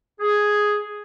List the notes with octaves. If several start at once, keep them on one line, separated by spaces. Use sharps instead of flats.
G#4